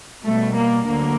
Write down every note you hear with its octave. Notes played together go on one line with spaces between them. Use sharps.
B2 G3 A3
A#3
D2 D3 F#3 A#3